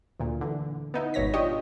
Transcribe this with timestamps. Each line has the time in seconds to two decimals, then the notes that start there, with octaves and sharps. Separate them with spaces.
0.20 D2 A#2
0.41 D3 E3
0.94 B3 D#4 E4
1.14 G#1 B2 C#5 A#6 B6
1.34 D4 F4 G4 C#5 D#5